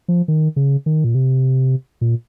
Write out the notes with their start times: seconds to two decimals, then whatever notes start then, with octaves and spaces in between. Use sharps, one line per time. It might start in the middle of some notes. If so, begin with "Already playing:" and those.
0.08 F3
0.28 D#3
0.56 C#3
0.86 D#3
1.04 A#2
1.15 C3
2.01 A#2